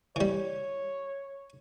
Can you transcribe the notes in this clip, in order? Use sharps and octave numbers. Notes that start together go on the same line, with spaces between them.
E3 G3 C#5